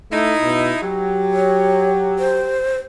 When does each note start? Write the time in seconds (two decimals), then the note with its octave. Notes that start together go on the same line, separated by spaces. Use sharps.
0.12 A3 D#4 E4
0.42 B2
0.82 F#3 G4
1.33 C#5
2.19 C5